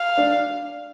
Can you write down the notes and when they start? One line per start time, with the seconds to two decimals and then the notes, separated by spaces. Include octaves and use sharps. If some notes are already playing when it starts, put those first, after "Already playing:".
Already playing: F5
0.17 D4